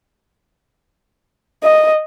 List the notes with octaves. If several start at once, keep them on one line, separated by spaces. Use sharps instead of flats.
D#5